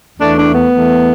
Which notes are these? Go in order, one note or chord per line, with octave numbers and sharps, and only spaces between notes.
E2 E3 A3 D4
D4
B3
E2 E3 A3